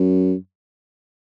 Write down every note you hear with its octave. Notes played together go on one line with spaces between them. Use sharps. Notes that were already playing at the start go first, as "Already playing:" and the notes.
Already playing: F#2